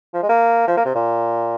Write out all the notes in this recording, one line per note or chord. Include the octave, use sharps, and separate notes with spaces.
F3
G#3
A#3
F3
A#3
C3
A#2